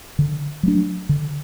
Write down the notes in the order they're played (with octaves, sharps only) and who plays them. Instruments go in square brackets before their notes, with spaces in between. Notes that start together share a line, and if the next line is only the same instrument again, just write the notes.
[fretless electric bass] D3
F#3 A3 D4
D3